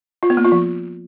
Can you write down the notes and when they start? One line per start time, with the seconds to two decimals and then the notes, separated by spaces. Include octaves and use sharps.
0.23 F4
0.30 B3
0.37 A#3
0.45 F4
0.52 F3